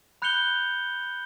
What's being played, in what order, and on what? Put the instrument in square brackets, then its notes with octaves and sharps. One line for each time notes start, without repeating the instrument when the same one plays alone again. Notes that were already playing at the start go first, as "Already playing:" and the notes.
[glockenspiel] B5 F#6 G6 C#7 F7 G7